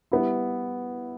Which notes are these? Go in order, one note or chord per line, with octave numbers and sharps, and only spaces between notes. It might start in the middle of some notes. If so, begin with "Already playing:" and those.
G3 B3 E4